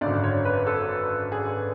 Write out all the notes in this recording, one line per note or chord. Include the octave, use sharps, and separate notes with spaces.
G#1 F#2 D3 D5
C#5
B4
A4
G#4